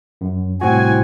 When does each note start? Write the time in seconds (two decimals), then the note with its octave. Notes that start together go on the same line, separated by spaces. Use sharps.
0.21 F#2
0.61 C2 A2 C4 F#4 F#5 G#5